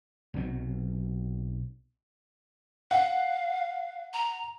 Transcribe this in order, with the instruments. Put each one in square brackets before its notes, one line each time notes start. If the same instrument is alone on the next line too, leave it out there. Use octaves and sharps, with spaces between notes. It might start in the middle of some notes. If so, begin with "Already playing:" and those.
[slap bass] B1 C3 F#3
[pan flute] F5 [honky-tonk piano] F#5
[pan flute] A#5